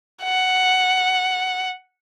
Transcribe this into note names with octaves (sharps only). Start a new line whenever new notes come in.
F#5